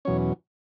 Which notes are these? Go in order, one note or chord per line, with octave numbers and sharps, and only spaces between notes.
E2 B2 F#3 C#4 C#5